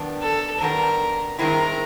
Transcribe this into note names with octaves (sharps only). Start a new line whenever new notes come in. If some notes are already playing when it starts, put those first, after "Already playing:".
Already playing: G2 D#3 G3 B3 D4
A4
G2 D#3 G3 B3 D4 A#4
G2 D#3 G#3 C4 E4 A#4